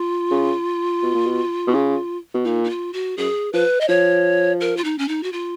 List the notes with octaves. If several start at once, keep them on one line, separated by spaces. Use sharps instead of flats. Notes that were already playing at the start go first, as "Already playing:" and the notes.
Already playing: F4
C#3
B2
A#2
B2
B2
C#3
B2
A#2 D#4
D#4
F4
F#4
F#2 G#4
F3 B4
D#5
F3 C#5
A#4
F4
D#4
C#4
D#4
F#4
F4